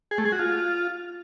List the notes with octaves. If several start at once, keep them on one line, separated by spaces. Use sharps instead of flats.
G#4
A3
G#4
F#4
F4